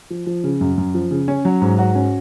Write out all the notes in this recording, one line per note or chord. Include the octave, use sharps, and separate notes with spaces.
F3
F3
C#3
F#2
F#2
F3
C#3
C#4
F#3
G#2
F#4
C#4